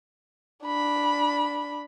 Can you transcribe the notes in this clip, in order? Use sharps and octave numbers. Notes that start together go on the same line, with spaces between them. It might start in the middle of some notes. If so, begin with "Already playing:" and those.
D4 B5